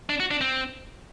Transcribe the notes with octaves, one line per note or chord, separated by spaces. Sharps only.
D4
F#4
D4
C4